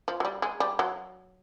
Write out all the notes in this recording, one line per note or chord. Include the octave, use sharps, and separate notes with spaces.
F3
F#3
G3
G#3
G3
F#3